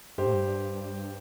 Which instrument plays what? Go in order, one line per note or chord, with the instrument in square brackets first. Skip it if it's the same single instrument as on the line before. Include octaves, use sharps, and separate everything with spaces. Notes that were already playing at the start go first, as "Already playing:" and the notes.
[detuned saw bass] G2 [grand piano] G4 C5
[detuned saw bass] A2
G2